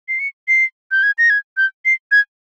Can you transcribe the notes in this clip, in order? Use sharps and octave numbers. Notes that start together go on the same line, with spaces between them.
C7
C#7
C7
G6
G#6
A#6
G#6
G6
C7
G#6